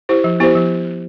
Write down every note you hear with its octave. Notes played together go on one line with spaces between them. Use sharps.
E4 G4 C5
F3
B3 E4 G4 C5
F3